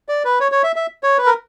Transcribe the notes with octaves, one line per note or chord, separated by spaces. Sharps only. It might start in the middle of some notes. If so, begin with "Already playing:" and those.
D5
B4
C#5
C#5
E5
E5
C#5
B4
A#4